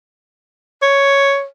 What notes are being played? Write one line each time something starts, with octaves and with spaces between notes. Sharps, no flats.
C#5